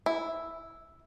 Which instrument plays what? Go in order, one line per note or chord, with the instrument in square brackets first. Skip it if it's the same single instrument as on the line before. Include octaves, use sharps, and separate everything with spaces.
[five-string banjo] E4